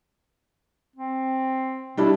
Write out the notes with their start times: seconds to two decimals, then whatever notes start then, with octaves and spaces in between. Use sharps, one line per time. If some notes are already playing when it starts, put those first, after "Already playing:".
0.96 C4
1.97 B2 G3 D4 E4